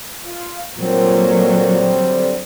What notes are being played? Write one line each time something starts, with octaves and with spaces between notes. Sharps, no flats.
F4
A#2 D3 F#3 G3 C4